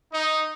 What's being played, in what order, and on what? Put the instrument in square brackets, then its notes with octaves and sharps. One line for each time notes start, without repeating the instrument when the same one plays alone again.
[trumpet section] D#4